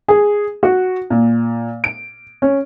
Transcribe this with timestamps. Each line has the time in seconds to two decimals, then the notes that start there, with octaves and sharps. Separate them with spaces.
0.08 G#4
0.63 F#4
1.10 A#2
1.84 D7
2.42 C#4